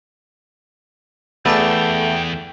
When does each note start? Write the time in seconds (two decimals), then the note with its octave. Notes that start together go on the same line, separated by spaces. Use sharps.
1.46 E2 A3 B3 D4 G#4 G5